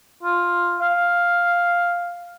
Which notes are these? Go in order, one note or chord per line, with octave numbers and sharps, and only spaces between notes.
F4
F5